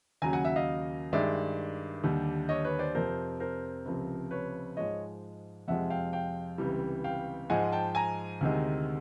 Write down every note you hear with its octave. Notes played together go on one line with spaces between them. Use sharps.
D#2 C#3 F#3 G#5 A#5
F#5 G#5
E5 F#5
D#5 F5
G2 D#3 G#3 D5 E5
D#2 D3 G3
C#5 D#5
B4 C#5
C5 D5
F2 C3 F3 A#4 C5
A#4 C5
C#2 C3 F3
B4 C#5
G#2 F3 G#3 C#5 D#5
F2 C3 F3 G#3 E5 F#5
F5 G5
F5 G5
C#2 C3 E3 G3
F5 G5
G#2 F3 G#3 F#5 G#5
G5 A5
G#5 A#5
D2 C3 D#3 G#3